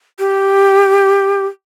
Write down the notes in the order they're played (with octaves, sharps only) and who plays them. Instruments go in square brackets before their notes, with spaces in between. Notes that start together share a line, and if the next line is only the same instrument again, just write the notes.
[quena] G4